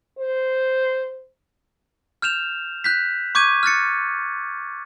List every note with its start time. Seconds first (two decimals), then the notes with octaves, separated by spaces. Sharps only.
0.19 C5
2.22 F6 G6 E7 F7
2.84 F#6 G6 B6
3.35 C#6 D6 G6 G#6 D#7
3.63 F6 F#6 A6 C#7